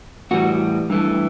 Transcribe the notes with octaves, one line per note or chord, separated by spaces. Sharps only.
A2 E3 G3 F#4
G2 E3 A3